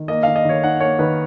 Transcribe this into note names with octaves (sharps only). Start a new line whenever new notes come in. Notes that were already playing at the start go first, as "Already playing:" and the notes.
Already playing: D#3
A#3 D#5
D#3 F5
D#5
D#3 C#5
D#4 F#5
A#3 C#5
D#3 B4